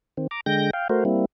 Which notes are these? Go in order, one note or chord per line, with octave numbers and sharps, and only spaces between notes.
D#3 C4
A#5 D6
D3 G#3 G5 G6 A#6
F5 G5
A3 F#4 A#4 C5
G3 A#3 C4 E4